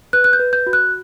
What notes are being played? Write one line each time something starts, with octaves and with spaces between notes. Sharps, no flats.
B4 F#6
F#6
G6
B4
G6
F#4
F#6